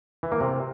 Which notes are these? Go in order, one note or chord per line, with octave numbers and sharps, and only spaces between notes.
E3
A#3
C3